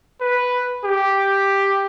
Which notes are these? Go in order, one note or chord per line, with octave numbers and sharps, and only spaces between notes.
B4
G4